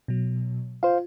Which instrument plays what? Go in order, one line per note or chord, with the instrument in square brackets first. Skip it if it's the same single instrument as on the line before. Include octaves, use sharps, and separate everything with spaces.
[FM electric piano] B2 F#3
[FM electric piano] F4 [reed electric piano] C5 F5